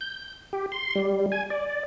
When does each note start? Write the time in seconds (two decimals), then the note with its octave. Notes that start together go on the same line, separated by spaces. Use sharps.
0.01 G6
0.53 G4
0.72 C6
0.95 G3
1.32 G#5
1.50 D5